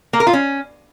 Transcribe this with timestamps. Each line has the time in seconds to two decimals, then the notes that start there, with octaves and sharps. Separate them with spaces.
0.13 A#3
0.20 A#4
0.27 F4
0.33 C#4